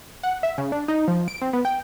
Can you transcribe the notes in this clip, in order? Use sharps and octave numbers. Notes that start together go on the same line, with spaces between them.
F#5
E5
C#3
D4
D#4
F3
D7
C4
B3
G5